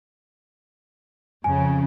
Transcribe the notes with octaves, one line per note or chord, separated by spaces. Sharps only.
F2 C#3 G#5